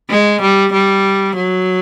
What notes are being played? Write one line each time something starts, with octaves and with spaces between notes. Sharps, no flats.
G#3
G3
G3
F#3